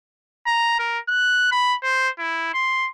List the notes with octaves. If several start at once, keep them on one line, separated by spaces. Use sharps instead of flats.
A#5
A#4
F#6
B5
C5
E4
C6